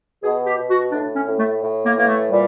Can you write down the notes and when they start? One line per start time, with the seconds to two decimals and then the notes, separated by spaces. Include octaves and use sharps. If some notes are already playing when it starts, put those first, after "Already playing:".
0.23 B2 G#4
0.46 G4
0.58 B2
0.70 F#4
0.92 A2 D4
1.15 C#4
1.27 A2
1.38 A3
1.61 A2
1.84 A#3
1.96 E3 A#3
2.07 A3
2.30 A#2 G3